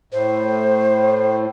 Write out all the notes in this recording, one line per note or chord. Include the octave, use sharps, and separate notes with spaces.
A2 C5